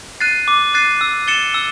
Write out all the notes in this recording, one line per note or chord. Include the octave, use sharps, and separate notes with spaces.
F#6 A6 C7 D#7
D6
F#6 A6 C7 D#7
E6
A6 C#7 E7 G7
E6